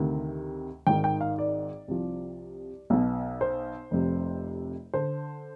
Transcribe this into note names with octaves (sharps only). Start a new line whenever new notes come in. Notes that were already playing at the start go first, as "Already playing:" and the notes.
Already playing: D2 C3 D#3
G#1 G#2 D#3 G5
G5
F5
D5
C2 C3 F3
B1 B2
C5
F1 F2 C3
D3 C5